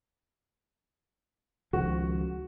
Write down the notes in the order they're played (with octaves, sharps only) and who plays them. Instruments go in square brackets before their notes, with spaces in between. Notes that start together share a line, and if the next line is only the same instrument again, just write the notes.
[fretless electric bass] C#2 D#3 F3 [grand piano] F#4